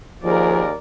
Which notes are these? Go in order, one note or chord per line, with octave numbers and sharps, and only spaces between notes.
D#2 F3 G#4 A#4 D5